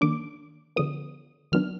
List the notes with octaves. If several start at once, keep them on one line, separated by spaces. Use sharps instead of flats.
D#3 A#3 D4 D6
D3 F3 B3 D#6
D#3 F#3 B3 D4 F6